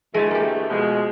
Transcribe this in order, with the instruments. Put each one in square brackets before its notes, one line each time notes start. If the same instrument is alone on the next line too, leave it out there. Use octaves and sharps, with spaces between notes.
[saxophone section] D2 E3 A3 [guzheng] G#3 G#5 A5
[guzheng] A#3 G4
[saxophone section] B2 F3 G#3